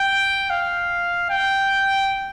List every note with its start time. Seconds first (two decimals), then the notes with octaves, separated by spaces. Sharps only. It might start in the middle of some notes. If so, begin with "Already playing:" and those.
Already playing: G5
0.50 F5
1.30 G5